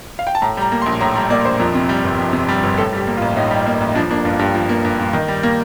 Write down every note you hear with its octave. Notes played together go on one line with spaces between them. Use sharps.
F5
G5
A5
A2 A#5
G3 A#5
A#3
C6
A#1
A2 A#5
G3 A#5
A#3 D5
A#1 C5
F2 A#4
C3
G3
G1
F2
C3
G3
G1
A2 A4
G3 G4
A#3
F4
A1
A2 D#4
G3
A#3
A1
D#4
F3 D4
A#3 D4
G2 F4
G2 G4
F3
A#3
G2
G2
D#3
G3
A#3